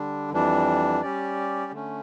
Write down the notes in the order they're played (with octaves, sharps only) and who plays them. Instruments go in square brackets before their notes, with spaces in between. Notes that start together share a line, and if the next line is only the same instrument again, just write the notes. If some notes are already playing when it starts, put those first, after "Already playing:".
Already playing: [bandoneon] D3 G3 D4
F2 E3 G3 D4
G3 C#4 G4 D5
D3 A3 C#4